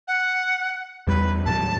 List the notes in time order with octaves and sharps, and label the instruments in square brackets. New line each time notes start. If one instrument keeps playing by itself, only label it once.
[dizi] F#5
[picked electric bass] E2 G3 [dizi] B4
[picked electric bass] D#2 A2 F#3 [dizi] A5